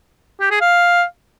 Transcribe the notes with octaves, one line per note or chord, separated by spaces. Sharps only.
G4
G#4
F5